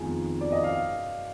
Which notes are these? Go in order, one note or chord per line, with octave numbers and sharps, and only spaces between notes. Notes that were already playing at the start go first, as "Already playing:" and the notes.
Already playing: F2 D#3 G#3 B3 F4 G#5
D5
D#5
F5